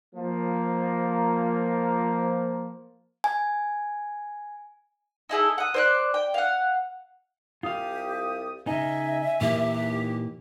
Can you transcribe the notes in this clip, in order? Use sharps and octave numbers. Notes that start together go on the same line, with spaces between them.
F3 A#3
G#5
D#4 E4 G#4 A4
F#5 D#6
C5 D5 F#6
G5
F5 F#5
C2 F4 G4 F5 D#6
C#3 D#4 D#5 E5 G#5
D#2 A#2 E3 A#3 G4